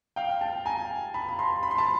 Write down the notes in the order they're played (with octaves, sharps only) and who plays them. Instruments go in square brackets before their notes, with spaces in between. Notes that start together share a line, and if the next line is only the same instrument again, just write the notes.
[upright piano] F5 G5
G5 A5
G#5 A#5
A5 B5
B5
A#5 C6
B5
C6
A5 B5